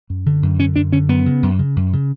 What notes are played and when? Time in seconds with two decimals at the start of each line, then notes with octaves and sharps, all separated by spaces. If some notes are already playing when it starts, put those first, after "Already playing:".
0.10 F#2
0.26 D3
0.43 F#2
0.59 D3 C#4
0.76 F#2 D4
0.92 D3 C#4
1.09 F#2 B3
1.26 C#3
1.43 F#2
1.59 C#3
1.76 F#2
1.93 C#3